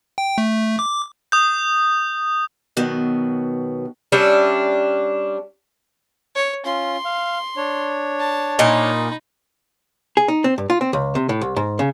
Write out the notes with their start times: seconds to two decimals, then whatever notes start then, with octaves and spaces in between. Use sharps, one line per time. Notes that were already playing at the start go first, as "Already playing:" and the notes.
0.18 G5
0.38 A3
0.79 D6
1.32 D#6 G6
2.77 B2 D#3 F#3 B3
4.12 G3 C#4 D4 E5
6.35 C#5
6.65 C#4 F4 C6
7.05 F5
7.57 D4 C#5
8.19 A5
8.59 A#2 D#4 D#5 B5
10.17 G#4
10.28 D#4
10.44 C4
10.58 G2
10.70 F4
10.81 C4
10.93 C#2
11.15 C3
11.29 A2
11.41 C2
11.56 G#2
11.79 C#3